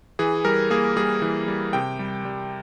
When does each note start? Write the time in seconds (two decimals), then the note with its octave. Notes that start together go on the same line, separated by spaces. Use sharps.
0.19 E3 G#4
0.45 G3 A#4
0.71 A#3 G#4
0.97 G3 G#4
1.22 E3
1.48 G3
1.73 C3 G5
1.99 G3
2.25 G3